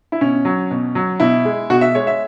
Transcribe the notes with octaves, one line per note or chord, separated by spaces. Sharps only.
E4
B2 C#4
F#3
B2
F#3
B2 E4
G#3
B2 F#4
E5
G#3 C#5
E5